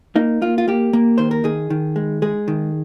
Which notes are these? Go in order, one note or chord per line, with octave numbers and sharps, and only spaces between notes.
A#3 D#4
A#3 F4
F4
A#3 G4
A#3
D#3 C5
A#4
D#3 G#4
D#3
G#3
G#3 G#4
D#3